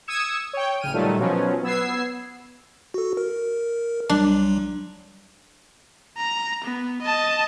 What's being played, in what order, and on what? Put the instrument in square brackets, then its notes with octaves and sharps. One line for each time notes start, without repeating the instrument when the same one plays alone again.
[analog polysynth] D#6 E6 G#6 C#7 E7
C#5 G5
A1 C#3 F6 D#7
A#2 D#3 F#3 G3 A3
B2 F3 F#3 C#4
B3 E6 G#6 C7
[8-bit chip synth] F#4 A4
A#4
[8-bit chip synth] B1 F#3 G3 [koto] D4
[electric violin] A#5
B3
D#5 A5